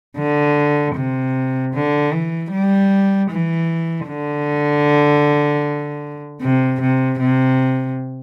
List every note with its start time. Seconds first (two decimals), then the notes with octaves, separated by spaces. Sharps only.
0.17 D3
0.95 C3
1.74 D3
2.12 E3
2.52 G3
3.30 E3
4.08 D3
6.42 C3
6.81 C3
7.20 C3